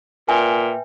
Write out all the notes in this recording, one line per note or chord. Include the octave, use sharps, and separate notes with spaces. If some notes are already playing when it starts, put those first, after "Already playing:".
A#2 B4 E5 G5 G#5